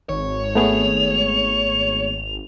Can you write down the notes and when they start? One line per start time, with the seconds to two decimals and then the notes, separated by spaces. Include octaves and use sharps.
0.09 G#1 C#5
0.55 A3 B3 G#4 F7